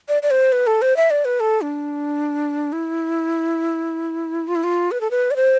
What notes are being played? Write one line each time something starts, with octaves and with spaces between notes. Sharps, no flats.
D5
D5
C5
B4
A4
C5
E5
D5
B4
A4
D4
E4
F4
E4
F4
B4
A4
B4
D5
C5